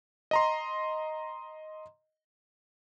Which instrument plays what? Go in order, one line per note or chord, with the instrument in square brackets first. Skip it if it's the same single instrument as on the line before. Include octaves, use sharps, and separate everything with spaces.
[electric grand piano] D#5 A#5 C6